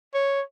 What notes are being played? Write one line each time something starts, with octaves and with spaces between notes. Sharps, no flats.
C#5